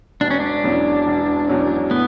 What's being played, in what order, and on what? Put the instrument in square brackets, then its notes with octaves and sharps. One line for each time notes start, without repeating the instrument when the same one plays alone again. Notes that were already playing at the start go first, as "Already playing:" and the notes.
[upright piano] E1 [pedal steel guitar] D4
[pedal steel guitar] C#4
D4
[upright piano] E2 B2 F#3 C#4
E1
E2 B2 F#3 C#4
[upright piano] A2 [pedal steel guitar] B3